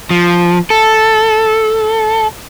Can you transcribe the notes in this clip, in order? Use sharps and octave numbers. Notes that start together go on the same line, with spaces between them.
F3
A4